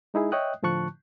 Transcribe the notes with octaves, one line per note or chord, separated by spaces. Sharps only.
G#3 D#4 E4 G#4
C#5 D#5 E5 G5 D#6 F#6
A2 D3 F3 A5 C#6 F#6